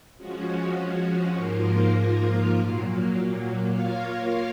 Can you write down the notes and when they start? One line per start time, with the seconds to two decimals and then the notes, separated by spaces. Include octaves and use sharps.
0.17 F3 G#3 C#4 F#4
1.34 G#2 F3 A#3 F4 A#4
2.51 A#2 F#3 A#3
3.69 A#3 F4 A#4 C#5 F5